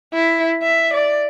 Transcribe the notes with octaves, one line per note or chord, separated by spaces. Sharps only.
E4
E5
D5